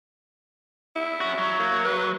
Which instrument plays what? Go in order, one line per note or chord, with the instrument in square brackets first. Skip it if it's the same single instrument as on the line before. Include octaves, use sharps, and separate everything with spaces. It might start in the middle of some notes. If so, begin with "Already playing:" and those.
[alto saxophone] E4
[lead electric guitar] C#4 F#4
F#3
[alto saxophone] A#3
B4